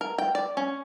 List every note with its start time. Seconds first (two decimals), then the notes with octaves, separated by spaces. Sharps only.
0.01 A#4
0.18 G5
0.35 D5
0.57 C#4